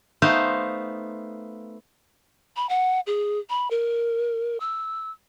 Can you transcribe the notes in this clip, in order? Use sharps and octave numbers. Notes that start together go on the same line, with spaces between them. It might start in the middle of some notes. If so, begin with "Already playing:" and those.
A3 B3 D#4 C5 F5
B5
F#5
G#4
B5
A#4
E6